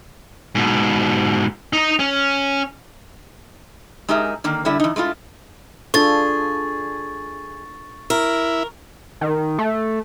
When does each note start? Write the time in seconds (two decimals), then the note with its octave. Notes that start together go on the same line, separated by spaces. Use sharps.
0.55 G#2 B2
1.73 D#4 D#5
1.99 C#4
4.09 G#3 D#4 G4 G#4 A#4 E5
4.44 D3 D#3 A#3
4.65 D3 G3 A3 E4 E5
4.80 E3 D#4
4.96 G#3 A3 E4 F4
5.94 D4 F4 G#4 A4 C#6 A6
8.10 E4 A#4
9.21 D#3
9.59 A3